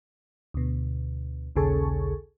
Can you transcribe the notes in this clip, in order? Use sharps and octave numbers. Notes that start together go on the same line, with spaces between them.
D2 B2
A#1 D#2 C#3 G#4 A4 C#6